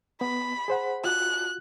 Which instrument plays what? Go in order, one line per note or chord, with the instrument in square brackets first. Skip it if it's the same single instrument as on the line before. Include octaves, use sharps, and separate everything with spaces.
[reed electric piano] B3 [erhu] B5
[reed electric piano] G#4 C5 F#5
[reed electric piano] F4 F#4 [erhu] F#6